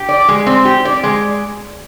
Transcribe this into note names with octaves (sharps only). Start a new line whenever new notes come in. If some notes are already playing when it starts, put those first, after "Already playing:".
Already playing: G4
D5
G#3
C4
G4
D5
G#3